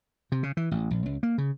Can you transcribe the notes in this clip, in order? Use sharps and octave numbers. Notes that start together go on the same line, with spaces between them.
C3
C#3
E3
A1
A#1
C#2
A#3
C#3